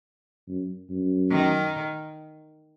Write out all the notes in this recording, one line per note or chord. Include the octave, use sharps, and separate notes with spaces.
F#2
F#2
D#3